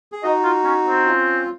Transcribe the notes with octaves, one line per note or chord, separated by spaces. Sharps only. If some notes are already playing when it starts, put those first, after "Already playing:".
G#4
D#4 F#4 D#5
F4
C#4
C4
C#4 F4